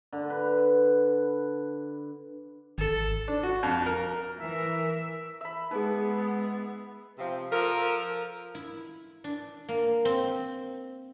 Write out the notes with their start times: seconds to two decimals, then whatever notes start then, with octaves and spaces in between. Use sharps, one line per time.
0.12 D3
0.30 B4
2.78 G#1 A4
3.28 D4
3.43 F#4
3.63 F2
3.86 A#4
4.39 E3 A#4 E5
5.41 E5 B5
5.71 G#3 B3 D#4 G#4 B4
7.18 C3 F3 C4
7.51 F3 A4 A#4
8.55 E4
9.24 D4
9.68 A#3
10.05 C4